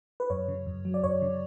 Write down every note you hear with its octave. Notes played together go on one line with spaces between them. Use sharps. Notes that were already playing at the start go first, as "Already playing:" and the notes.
B4
F#2 C#5
C#3
F#2
F#3
D5
F#2 C#5
C#3